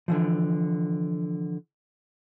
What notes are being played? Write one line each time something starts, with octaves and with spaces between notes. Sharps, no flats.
D3 E3 F3